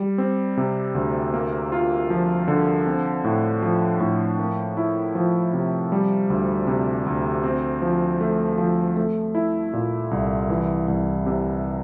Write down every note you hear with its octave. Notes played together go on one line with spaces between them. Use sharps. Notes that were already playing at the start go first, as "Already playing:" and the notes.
Already playing: G3
C4
C3
D2
A#3
F4
F3
D3
C4
A2
F3
A2
A#3
E4
F3
C3
G3
D2
C3
D2
C4
F3
A3
F3
A3
E4
A#2
C2
E3
C2
C3